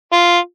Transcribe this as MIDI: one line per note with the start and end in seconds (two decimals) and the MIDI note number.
0.13 0.37 65